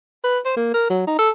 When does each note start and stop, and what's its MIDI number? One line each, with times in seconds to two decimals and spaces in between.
0.24 0.39 71
0.45 0.54 72
0.57 0.71 58
0.74 0.85 70
0.90 1.07 54
1.07 1.17 63
1.19 1.30 69